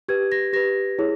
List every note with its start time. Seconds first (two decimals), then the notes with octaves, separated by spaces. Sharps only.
0.09 G4 B4 G#6
0.32 A#6
0.53 G4 B4 A#6
0.99 E4 G#4 C#5